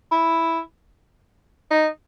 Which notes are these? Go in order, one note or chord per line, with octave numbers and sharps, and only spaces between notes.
E4
D#4